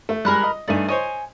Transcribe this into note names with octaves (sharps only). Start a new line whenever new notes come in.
A3
G3 G#3 A#4 B5 F#6
D#5
G2 A3 D#4 D5 G#5
C5 C#5 D#5 G#5